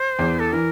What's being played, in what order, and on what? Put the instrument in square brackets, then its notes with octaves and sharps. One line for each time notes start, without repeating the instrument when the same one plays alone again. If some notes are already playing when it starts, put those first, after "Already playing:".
Already playing: [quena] C5
[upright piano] E2 E3
[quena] A4
[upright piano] E3 [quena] A#4